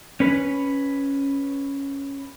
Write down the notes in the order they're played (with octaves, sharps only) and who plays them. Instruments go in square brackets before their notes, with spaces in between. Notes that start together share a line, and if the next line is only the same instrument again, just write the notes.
[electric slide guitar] C#4 B4